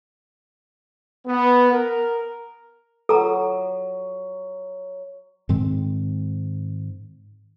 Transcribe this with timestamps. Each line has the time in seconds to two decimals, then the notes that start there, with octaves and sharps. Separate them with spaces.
1.26 B3
1.72 A#4
3.09 F#3 A4 A#5
5.49 G#2 D#3 G#3 C4